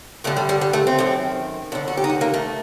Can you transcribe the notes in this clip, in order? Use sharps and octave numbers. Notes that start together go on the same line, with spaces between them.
G2 D3 A3
G3
G3
G3
A3
C4
F#2 D#3
D#2 D3 D4
F#4
G4
D#4
F#4
A#3
A3